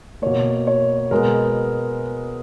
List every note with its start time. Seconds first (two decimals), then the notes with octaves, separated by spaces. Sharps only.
0.22 B2 A#3 C#5
0.67 C#5
1.11 B2 G#3 B3 A#4